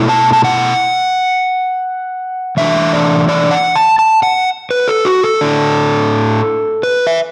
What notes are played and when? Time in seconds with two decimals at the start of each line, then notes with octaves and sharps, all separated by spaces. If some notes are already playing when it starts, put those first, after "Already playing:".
Already playing: B2 A3 E4
0.09 A5
0.33 A5
0.44 F#5
2.57 E3 A3 D4 E5
2.93 D5
3.29 D5
3.51 F#5
3.76 A5
3.99 A5
4.23 F#5
4.71 B4
4.88 A4
5.05 F#4
5.23 A4
5.41 A2 A3 D4
6.83 B4
7.07 E5